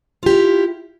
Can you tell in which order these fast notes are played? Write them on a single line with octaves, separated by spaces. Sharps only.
F4 G4 E4